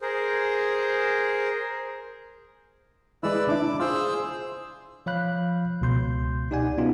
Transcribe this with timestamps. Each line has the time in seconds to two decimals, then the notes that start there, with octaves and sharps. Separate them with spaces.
0.02 G#4 A#4 C5
3.23 G#3 E4 B4 D5 E6
3.49 D4 E4 D6
3.80 F4 G#4 C5 E6
5.06 F3 C#5 F5 B5 F#6 G6
5.81 C#2 B2 C6 G6
6.51 D#4 G4 D5 F#5 G#5
6.78 B3 C#4 D#4 F4 F#4